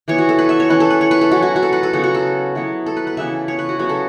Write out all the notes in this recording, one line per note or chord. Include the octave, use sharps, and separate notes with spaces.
E3 B3 E4 C#5
F#4
A4
B4
E5
C#5
E3 C#4 E4 B4
A4
B4
C#5
B4
A4
F#3 C#4 E4 F#4
F#4
F#4
A4
B4
A4
C#3 F#3 B3 F#4
F#4
A4
F#3 B3 E4
A4
B4
B4
C#3 E3 B3 E4 E5
C#5
B4
F#4
C#3 F#3 B3 F#4
A4